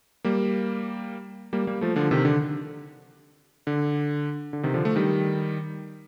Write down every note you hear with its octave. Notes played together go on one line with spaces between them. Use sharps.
G3 A#3
G3 A#3
G3 A#3
F3 A3
D3 F3
C3 D#3
D3
D3
D3
C3 D#3
D3 F3
F3 A3
D#3 G3